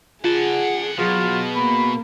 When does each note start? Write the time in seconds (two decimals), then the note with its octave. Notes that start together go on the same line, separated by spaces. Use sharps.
0.24 F4 G#4 F#5 A5
0.99 B2 F#3 F4 G#4
1.56 A#3 B5